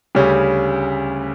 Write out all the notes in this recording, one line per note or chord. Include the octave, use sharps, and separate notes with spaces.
D2 C#3 G3 C#4